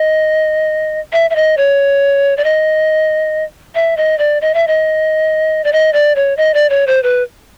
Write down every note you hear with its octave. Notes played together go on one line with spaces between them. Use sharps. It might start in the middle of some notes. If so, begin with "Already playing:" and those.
Already playing: D#5
E5
E5
D#5
C#5
D5
D#5
E5
D#5
D5
D#5
E5
D#5
D5
D#5
D5
C#5
D#5
D5
C#5
C5
B4